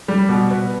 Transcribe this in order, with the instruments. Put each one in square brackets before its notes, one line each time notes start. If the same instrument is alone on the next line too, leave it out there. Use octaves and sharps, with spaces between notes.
[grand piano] G3
B2
B3